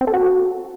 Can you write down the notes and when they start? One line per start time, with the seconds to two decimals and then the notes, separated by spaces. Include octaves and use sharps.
0.01 C4
0.07 A4
0.14 F#4